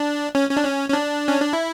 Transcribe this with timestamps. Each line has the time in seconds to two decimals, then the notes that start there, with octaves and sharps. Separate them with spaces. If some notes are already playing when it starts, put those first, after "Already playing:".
Already playing: D4
0.35 C#4
0.49 C#4
0.57 D4
0.65 C#4
0.89 C#4
0.93 D4
1.28 C#4
1.40 D4
1.53 E4